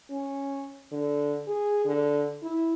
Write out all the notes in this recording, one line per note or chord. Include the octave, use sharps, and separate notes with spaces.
C#4
D3
G#4
D3
E4